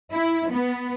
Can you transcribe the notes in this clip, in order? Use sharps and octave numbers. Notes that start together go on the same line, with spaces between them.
E4
B3